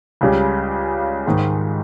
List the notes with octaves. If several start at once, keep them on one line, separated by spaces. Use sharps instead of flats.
C#2 C#3 G3
G#2 D#3 G#3